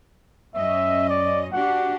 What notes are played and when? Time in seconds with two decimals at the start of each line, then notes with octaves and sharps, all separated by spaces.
0.55 F#2 C#4 D#5 E5
1.10 D5
1.53 D4 F#4 G4 F#5